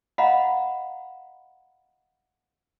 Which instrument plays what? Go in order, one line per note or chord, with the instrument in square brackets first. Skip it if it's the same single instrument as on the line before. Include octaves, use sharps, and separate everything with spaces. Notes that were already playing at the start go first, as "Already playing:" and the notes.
[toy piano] D#5 F5 F#5 A#5 B5